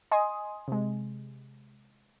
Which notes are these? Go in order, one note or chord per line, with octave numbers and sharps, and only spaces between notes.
D#5 G#5 C6 D#6
C3 G#3